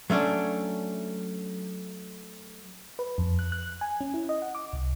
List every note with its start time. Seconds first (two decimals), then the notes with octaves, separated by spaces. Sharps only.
0.10 F#3 A3 C#4 D4
2.99 B4
3.18 F2
3.39 F#6
3.52 F#6
3.81 G#5
4.01 C#4
4.14 E4
4.29 D#5
4.42 F#5
4.55 D6
4.73 C2